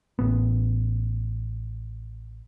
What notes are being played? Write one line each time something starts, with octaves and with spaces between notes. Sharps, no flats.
A1 B3